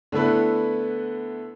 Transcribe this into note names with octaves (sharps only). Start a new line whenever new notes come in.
D3 A3 B3 E4 B4